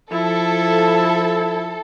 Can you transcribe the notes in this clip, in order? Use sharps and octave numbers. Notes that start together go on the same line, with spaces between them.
F3 E4 A4